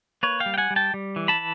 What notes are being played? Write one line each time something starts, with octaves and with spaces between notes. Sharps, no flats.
A#3 B4 C#5
F5 G5
G3
G5
F#5 G#5
G3
G5 A5
G3
E3
A5 B5